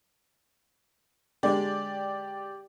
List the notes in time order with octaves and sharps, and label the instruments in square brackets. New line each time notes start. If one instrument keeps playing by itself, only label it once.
[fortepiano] D3 G#3 [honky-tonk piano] G4 D5